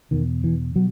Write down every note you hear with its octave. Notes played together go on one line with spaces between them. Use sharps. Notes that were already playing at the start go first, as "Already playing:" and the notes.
E2 B2 D#3
E3
B2 F#3